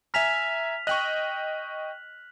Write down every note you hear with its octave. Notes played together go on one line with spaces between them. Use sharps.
E5 G#5 A#5 F6 B6 F7
D#5 G5 C#6 F#6 F#7